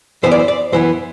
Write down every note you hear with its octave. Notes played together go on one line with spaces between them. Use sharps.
F#2 E3 B3 C5
D5
C5
D5
F#2 E3 B3 C5